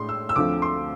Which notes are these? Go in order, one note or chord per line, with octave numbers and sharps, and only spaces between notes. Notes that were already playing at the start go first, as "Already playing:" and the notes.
Already playing: A2 G#3 D4 C6
E6
E6
D2 D3 F3 A3 C4 D6
C6